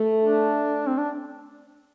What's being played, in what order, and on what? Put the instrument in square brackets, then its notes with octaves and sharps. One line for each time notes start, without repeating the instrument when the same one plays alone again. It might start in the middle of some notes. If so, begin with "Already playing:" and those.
Already playing: [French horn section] A3
[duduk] D4
C4
D4